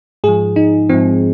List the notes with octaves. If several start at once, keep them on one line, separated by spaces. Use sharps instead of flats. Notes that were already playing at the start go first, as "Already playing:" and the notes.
G#2 F3 G#4
D#4
G#2 F3 C4